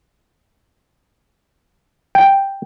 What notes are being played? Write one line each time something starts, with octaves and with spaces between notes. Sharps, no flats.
G5